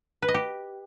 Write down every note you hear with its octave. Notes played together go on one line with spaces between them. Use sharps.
B4
D#5
G4